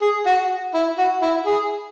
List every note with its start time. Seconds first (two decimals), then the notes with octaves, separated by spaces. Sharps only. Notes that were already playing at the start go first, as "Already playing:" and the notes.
0.01 G#4
0.26 F#4
0.74 E4
0.98 F#4
1.22 E4
1.46 G#4